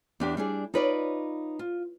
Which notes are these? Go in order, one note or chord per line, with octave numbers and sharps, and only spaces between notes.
E2 D4 G4
G3 D4 G#4
D#4 F4 B4 C#5 D5
F4